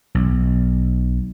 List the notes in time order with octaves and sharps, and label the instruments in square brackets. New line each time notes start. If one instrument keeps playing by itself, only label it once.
[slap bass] B1